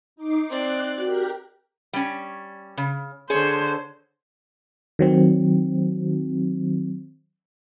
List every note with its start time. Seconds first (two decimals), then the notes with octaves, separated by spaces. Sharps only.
0.16 D#4 D6 C7
0.49 C4 D5 F#6
0.99 F#4 G4 A#4
1.93 G3 C#4
2.77 C#3
3.30 D3 G#4 C5 C#5
4.99 D#3 F#3 C4